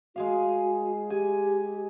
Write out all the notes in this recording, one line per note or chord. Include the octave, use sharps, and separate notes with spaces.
G#3 F#4 G#4 F5
G4 G#5